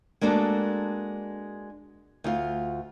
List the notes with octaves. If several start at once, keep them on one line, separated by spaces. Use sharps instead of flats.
G#3 A#3 D4 F#4 A4
D2 F4